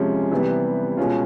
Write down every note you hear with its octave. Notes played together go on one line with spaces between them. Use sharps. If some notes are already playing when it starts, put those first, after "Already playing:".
Already playing: C3 F3 G#3 C#4
C3 E3 G3 B3
B2 G#3 C#4 F4